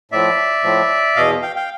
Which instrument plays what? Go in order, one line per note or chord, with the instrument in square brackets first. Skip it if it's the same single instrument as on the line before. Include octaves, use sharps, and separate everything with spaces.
[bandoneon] A2 F3 D5 E5
A2 F3
E2 B2 D#5 F5
F5 G5
F5 G5